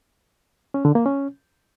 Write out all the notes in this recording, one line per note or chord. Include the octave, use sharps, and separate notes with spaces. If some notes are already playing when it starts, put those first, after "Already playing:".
C#4
D3
A#3
C#4